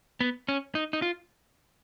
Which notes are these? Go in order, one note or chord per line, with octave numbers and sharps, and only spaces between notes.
B3
C#4
D#4
D#4
F4